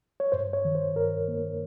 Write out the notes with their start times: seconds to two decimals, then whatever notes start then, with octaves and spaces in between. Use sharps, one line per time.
0.20 C#5
0.32 G2 C5
0.53 C#5
0.65 D#3
0.75 C5
0.96 G2 A#4
1.28 A#3